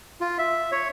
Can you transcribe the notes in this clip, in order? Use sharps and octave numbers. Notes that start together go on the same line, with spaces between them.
F4
E5
C#5